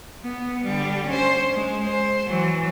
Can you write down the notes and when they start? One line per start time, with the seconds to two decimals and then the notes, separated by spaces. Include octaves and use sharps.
0.23 B3
0.63 D3 G3
1.07 C#4 C5
1.56 G#3
1.84 C5
2.26 E3 F#3